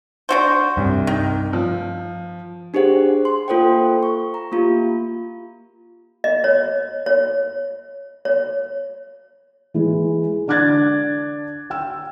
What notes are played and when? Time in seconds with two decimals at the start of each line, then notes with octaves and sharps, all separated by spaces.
0.29 D4 F#4 C5
0.77 C2 G2
1.07 D#3
1.53 F3
2.74 D4 G4 G#4 C5 F#5
3.25 C6
3.48 A#3 F4 A4 C5 F#5 G5
4.03 C#6
4.34 A#5
4.52 A#3 F4 G4
6.24 D#5
6.44 C#5
7.06 C#5
8.25 C#5
9.74 E3 G#3
10.47 D3 D4 D6 F#6 G#6 A6
11.70 G5 E6